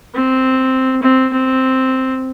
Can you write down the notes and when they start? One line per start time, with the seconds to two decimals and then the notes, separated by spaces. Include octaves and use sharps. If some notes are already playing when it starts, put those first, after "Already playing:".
0.14 C4
1.02 C4
1.33 C4